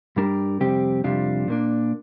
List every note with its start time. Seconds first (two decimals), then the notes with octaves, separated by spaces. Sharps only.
0.16 G2 G3 D4 G4 A#4
0.60 F2 C3 G3 C4 G4
1.04 F2 C3 G3 D4 F4
1.48 A#2 A#3 D4